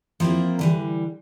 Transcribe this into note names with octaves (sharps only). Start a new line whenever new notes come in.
F3 A#3 C4 E4 A#4
D3 E3 G3